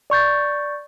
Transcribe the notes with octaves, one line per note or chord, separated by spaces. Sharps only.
D5 C#6 G6 A6